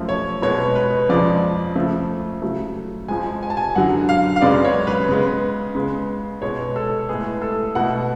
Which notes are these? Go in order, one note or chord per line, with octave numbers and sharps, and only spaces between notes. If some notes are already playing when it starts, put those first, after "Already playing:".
Already playing: F#2 F3 A3
C#5
B2 G#3 B3 C#5
B4
F2 C#3 F3 G#3 D5
C#3 F3 A3
C#3 F#3 A3
F2 F3 G#3 G#5
G#5
A5
G#5
F#2 D3 F#3 F#5
F5
F5
F#2 C#3 G#3 B3 D5
C#5
B4
C#3 G#3 B3
C#3 G#3 B3
B2 G#3 B3 C#5
A4
A2 G#3 B3 G#4
A4
B2 A3 F#5